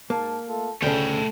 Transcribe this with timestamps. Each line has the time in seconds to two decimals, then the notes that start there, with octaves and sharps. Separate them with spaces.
0.10 G#2 A#3 A5
0.47 A3 F4 A4
0.82 D2 C#3 A3 A4 G5